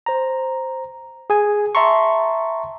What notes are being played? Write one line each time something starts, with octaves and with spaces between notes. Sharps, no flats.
C5 A#5
G#4 G#5
E5 A5 A#5 C6 C#6